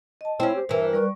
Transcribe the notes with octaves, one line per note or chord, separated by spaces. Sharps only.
D#5 A5
C4 C#4 E4 C5
G4
G2 E3 A#4 E5
G3 B4 D5 C#6